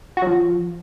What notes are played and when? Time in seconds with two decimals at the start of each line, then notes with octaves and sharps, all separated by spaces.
0.17 F#4
0.22 F#3
0.27 F3